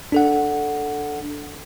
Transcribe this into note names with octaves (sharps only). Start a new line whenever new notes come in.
D4 A4 F#5